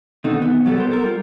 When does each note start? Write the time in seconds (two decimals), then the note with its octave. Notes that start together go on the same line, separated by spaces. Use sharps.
0.24 B2 D3 D#3 A3 C4 D#4
0.42 D#2 B3
0.65 B2 F#3 G3 B3 A4
0.78 B3 A#4 C5
0.91 A4 A#4
1.04 G3 F4